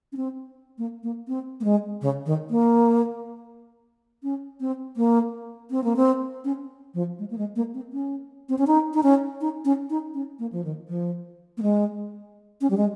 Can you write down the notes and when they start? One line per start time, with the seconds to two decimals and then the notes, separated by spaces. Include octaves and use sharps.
0.12 C#4
0.17 C4
0.78 A#3
1.03 A#3
1.28 C4
1.60 A#3
1.64 G#3
2.02 C#3
2.26 D#3
2.50 A#3
4.23 C#4
4.60 C4
4.97 A#3
5.71 C4
5.84 A#3
5.96 C4
6.45 C#4
6.94 F3
7.19 G#3
7.30 A#3
7.38 G#3
7.56 A#3
7.74 C4
7.93 C#4
8.49 C4
8.58 C#4
8.67 D#4
8.94 D#4
9.03 C#4
9.41 D#4
9.65 C#4
9.90 D#4
10.14 C#4
10.39 A#3
10.53 F3
10.64 D#3
10.88 F3
11.57 A#3
11.62 G#3
12.61 C#4
12.70 G3
12.77 G#3